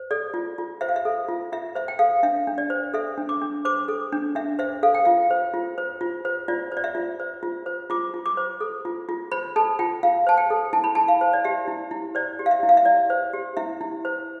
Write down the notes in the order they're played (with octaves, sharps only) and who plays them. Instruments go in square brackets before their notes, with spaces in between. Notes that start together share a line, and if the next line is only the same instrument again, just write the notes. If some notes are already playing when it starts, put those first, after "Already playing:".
Already playing: [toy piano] C5
A4 D5
F4
F4
C5 E5
F5
E5
A4
F4
F4 E5
C5 E5
G5
A4 F5
D4 E5
D4
D5
C5
A4 E5
D4
D6
D4
C5 D6
A4
D4
D4 E5
C5 E5
A4 F5
G5
F4 F5
C5
F4
C5
F4
C5
F4 D5
C5
D5
E5
F4
C5
F4
C5
F4 D6
F4
D6
C5
A4
F4
F4
C5 B5
A4 A5
F4 G5
F4 F5
C5 A5
G5
A4
E4 A5
B5
E4 A5
F5
C5
D5
G4 E5
E4
E4
C5 D5
G4
F5
E5
E4
F5
E5
E4 D5
C5
G4
E4 E5
E4
C5